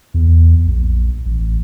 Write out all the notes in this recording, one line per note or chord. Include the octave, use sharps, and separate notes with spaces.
E2
A#1
A1